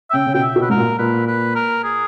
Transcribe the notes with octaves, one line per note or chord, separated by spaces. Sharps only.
E5
C#3 G5
C#3
B2 G5
E5
B2
B4
G#2 A#4
A#2
A#2 B4
B4
A#4
G#4